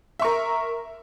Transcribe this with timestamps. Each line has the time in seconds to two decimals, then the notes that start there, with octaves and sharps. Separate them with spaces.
0.19 E5
0.22 C#6
0.25 A#4